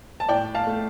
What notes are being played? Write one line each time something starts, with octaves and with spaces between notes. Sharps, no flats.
A5
A2 D5 G5
F5 A5
A3